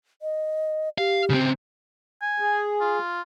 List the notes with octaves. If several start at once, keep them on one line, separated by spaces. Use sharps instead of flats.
D#5
G4 F5
C#3 C4
G#5
G#4
F4